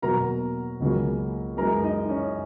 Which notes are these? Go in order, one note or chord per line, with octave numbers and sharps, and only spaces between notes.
E2 B2 F#3 A#3 A#4 A#5
C#2 C#3 F#3 A#3
F#2 E3 G#3 A#4 A#5
D#4 D#5
C#4 C#5